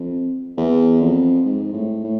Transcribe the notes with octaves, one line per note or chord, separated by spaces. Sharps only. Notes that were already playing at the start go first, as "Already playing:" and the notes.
Already playing: F2
E2
F2
G#2
A2
A2